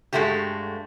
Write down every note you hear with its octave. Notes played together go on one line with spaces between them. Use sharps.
G2 B2 G#3 A3 F#4 G4